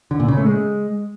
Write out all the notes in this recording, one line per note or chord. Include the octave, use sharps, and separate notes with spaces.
D3
A#2
C#3
A3
G#3